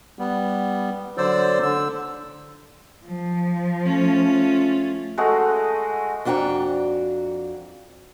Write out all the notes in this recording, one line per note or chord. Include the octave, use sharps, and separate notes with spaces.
G3 B3
D3 F#3 C5 D5 E6
D3 E6
F3
A3 C#4 F4
G#3 A3 F#4 D#5
F2 D4 F#4 G5 A#5